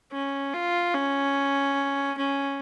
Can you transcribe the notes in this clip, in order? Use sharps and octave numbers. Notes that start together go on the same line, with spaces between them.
C#4
F4
C#4
C#4